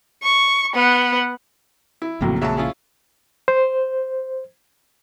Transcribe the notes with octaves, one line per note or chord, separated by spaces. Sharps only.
C#6
B3 F#5
E4
A#1 F2 A2 C#3 F#3 A#3
F2 F#3 G#3 E5 A5
C#4 E4 F4 G#4
C5